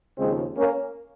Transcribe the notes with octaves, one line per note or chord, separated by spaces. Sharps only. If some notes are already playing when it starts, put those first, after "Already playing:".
D#2 C#3 F3 G#3 C4
A#3 C#4